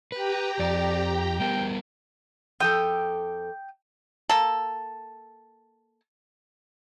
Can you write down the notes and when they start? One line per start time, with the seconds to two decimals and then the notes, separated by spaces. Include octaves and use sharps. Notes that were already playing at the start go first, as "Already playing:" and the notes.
0.12 G4 B4 G5 A#5
0.59 F2 D5
1.40 G3 B3 A#4 G5
2.60 F2 G4 A4 G5 D#6
4.29 A#3 A4